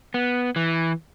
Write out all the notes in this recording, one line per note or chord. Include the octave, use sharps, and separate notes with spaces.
B3
E3